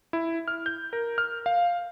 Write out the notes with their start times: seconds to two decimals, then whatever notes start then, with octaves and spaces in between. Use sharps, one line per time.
0.13 E4
0.48 F6
0.66 G6
0.93 A#4
1.18 F6
1.46 F5